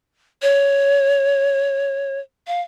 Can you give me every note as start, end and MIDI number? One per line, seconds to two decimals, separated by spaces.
0.42 2.19 73
2.47 2.61 77